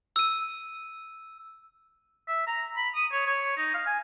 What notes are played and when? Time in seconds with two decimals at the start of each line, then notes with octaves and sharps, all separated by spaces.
0.16 E6 D#7
2.28 E5
2.47 A#5
2.76 B5
2.95 D#6
3.12 C#5
3.26 C#5
3.57 D#4
3.74 F5
3.86 G#5